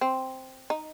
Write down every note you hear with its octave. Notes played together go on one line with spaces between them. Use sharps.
C4
D#4